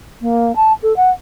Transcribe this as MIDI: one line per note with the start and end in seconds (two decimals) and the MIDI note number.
0.21 0.55 58
0.56 0.72 81
0.82 0.95 69
0.96 1.10 78